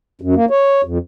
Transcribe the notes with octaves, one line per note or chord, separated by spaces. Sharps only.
F#2
A#3
C#5
F2